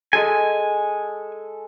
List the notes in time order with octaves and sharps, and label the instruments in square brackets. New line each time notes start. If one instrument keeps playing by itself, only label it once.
[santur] G#3 A4 [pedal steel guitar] G#5